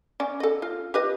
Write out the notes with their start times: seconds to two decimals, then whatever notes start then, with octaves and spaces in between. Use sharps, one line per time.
0.20 C#4 D5
0.40 A4 D#5
0.62 F4
0.94 G4 B4 D#5